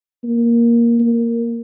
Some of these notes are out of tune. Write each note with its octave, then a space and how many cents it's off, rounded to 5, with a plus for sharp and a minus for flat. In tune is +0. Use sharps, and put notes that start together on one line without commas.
A#3 +10
A#3 -5